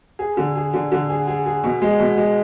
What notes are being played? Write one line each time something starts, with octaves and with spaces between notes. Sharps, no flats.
G#4
D3
G#4
D3
D3
G#4
G#4
G#4
B2
G#3
B2
G#3